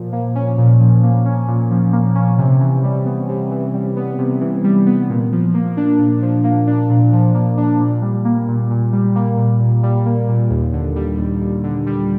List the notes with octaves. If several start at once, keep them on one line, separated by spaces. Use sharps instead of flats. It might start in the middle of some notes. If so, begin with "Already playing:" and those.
Already playing: A#2 F3
A#3
C#4
A#2
F3
A#3
C#4
A#2
F3
A#3
C#4
C3
E3
G3
B3
C3
E3
G3
B3
C3
E3
G3
B3
A#2
F3
A#3
D4
A#2
F3
A#3
D4
A#2
F3
A#3
D4
A#2
G3
A#3
A#2
A#2
G3
A#3
A#2
A#2
G3
A#3
A#2
D#2
D3
G3
D#2
D#2
D3
G3